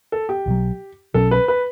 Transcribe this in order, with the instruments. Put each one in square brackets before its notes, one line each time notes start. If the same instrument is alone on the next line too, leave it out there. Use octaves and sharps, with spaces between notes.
[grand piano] A4
G4
[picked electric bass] B1 B2 F#3
[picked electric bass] B1 B2 F#3 C#4 [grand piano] A4
[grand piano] B4
B4